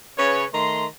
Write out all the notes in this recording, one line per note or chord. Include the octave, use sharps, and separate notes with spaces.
C#3 B4 C#5
D#3 A3 A#5 C6